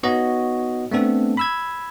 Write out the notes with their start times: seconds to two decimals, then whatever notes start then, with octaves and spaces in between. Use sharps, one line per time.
0.03 B3 D#4 F#4 C#5 D#5
0.91 A3 B3 C4 D4 A4
1.37 B5 E6 G#6